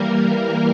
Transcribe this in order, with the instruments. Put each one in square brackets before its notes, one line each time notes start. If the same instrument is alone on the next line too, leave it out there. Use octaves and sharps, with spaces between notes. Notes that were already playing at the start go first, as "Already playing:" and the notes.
Already playing: [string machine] E3 G3 A#3 A#4